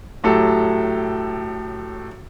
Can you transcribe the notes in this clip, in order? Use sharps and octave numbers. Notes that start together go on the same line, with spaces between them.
A2 F#3 G4 A4